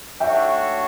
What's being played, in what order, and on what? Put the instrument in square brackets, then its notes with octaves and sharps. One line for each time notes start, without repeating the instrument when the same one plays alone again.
[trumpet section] A3 D4 F#4 C#5 [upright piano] E5 G5